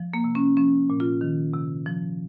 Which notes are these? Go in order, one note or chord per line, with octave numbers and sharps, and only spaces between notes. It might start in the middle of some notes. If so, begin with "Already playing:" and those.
Already playing: F3
A#3
C3
C#4
F3 C#4
A#2
F4
D#3
C3
F3